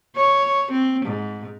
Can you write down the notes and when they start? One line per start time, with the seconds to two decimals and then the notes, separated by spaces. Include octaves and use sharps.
0.16 C#5
0.72 C4
1.05 G#2